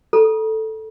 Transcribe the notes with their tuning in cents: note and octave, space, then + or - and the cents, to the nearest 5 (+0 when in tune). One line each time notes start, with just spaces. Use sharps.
A4 +0 A#5 +45